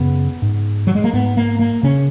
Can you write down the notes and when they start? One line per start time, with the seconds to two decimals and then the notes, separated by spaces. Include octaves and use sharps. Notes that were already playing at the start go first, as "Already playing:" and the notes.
Already playing: F#2 C#3 B3
0.42 G#2
0.87 F#3
0.95 G#3
1.04 A#3
1.13 G#2 B3
1.37 A#3
1.59 A#3
1.83 C#3 C#4